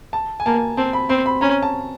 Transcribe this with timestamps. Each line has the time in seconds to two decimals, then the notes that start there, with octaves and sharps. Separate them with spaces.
0.13 A5
0.40 G#5
0.46 A#3 A5
0.77 C4 A5
0.93 B5
1.09 C4 C6
1.26 B5
1.41 C#4 A#5
1.63 A5